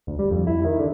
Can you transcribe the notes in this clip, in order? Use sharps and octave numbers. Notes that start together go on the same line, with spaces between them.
D2
G3
F2
E4
D#3
D3